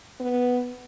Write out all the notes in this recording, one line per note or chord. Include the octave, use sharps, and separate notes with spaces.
B3